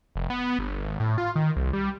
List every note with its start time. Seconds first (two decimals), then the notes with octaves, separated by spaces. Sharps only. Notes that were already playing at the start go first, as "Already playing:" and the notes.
0.16 F1
0.30 B3
0.59 G1
0.84 G#1
1.00 A2
1.18 F4
1.35 D#3
1.56 C2
1.73 G3